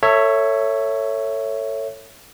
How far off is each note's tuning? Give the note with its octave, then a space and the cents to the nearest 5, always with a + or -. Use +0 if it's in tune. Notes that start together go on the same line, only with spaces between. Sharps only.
A4 +30 C#5 +0 E5 +0